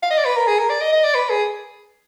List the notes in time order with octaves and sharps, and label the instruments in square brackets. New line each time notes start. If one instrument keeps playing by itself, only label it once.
[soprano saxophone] F5
D#5
D5
B4
A#4
G#4
A#4
D5
D#5
D#5
D5
B4
G#4